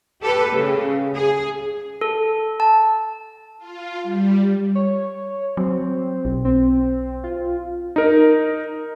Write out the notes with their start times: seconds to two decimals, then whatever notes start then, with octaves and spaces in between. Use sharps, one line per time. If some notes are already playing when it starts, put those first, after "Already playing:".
0.22 G4 A4 B4
0.52 C#3
1.15 G#4
2.01 A4
2.60 A5
3.58 F4
4.03 G3
4.75 C#5
5.57 F#3 C4
6.25 B1
6.45 C4
7.24 F4
7.96 D#4 A#4